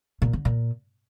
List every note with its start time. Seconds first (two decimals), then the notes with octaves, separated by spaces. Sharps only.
0.22 A#2
0.33 D3
0.45 A#2